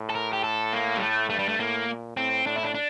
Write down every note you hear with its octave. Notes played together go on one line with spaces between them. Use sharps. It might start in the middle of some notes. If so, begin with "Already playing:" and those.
Already playing: A2
A4
A#4
G4
A4
A#3
G3
A3
G2 A3
G3
A3
A2 A#3
A#2
A2 C4
A2 D4
E4
D4
D4